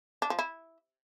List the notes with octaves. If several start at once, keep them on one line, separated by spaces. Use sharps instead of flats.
D4
F3
E4